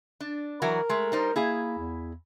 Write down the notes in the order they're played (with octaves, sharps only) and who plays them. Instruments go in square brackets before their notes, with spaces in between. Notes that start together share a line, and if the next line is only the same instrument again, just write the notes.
[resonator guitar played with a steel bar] D4
[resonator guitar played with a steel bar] E3 F#3 F#4 [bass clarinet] A#4
[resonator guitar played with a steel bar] G#3 A3
G3 D#4 C5
[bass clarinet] A#3 [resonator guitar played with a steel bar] E4 G#4 F5
[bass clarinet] E2